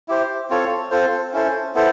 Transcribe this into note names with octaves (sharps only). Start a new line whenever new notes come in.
E4 G4 C5
C4 F4 A4 C#5
C4 F4 A4 C5
C#4 E4 A4 C5
B3 E4 A4 C5